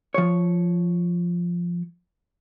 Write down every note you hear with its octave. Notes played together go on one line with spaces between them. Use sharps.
F3 C#5